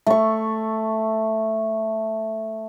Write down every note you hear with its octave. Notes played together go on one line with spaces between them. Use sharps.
A3 C#6